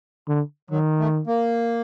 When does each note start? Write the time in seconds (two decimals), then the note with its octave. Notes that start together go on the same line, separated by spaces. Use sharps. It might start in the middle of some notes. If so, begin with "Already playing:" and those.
0.28 D3
0.70 D#3 F#3
0.99 A3
1.27 A#3